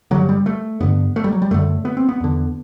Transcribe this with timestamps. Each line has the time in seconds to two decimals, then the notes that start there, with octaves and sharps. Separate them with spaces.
0.11 G2 D3 F#3
0.29 G3
0.46 A3
0.81 G2 D3 B3
1.16 A3
1.24 G3
1.33 F#3
1.42 G3
1.51 F#2 D3 A3
1.85 B3
1.97 C4
2.09 B3
2.20 E2 D3